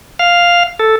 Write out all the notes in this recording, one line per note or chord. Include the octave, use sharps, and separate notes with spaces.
F5
A4